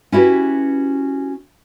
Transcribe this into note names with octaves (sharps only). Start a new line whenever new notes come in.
C#4 E4 F#4 G4 B4